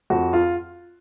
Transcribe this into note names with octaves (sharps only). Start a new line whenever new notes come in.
F2 F#4
F4